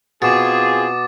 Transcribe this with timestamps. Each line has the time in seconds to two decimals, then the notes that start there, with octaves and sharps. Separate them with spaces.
0.22 B2 C4 F4 G#4 D6 A6